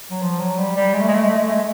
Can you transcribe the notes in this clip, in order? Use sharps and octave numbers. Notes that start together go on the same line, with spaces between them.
F#3
F3
F#3
G3
G3
G#3
A3
G#3
A3
G#3
A3
G#3
A3
G#3